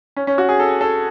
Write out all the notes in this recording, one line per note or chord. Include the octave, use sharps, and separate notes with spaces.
C#4
C#4
F#4
G#4
A4
A4